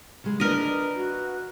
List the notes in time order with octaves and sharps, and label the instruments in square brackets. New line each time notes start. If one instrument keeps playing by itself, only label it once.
[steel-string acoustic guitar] C#3 G#3
[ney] D4 [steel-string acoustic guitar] F4 B4 [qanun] A#4 D#5
[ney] F#4